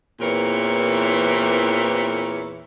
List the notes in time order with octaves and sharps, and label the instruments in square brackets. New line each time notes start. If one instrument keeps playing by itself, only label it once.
[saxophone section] E2 A#2 E3 C4 A#4 C#5